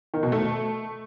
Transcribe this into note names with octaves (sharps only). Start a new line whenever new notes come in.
D#3
B2
A3